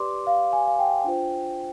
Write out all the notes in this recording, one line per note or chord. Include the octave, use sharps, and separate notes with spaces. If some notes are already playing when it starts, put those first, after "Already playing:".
Already playing: G4 B4 D5 C6 D6
F5
G#5
F5
G5
D4 F4 C5